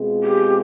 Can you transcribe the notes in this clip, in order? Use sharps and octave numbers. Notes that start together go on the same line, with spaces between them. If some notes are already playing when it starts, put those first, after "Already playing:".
Already playing: B2 G#3 C4 F4 G#4
G4